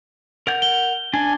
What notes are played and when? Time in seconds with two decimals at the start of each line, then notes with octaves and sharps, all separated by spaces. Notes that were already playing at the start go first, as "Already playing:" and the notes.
0.47 A#4 F#5 G6
0.62 G7
1.14 D4 G#5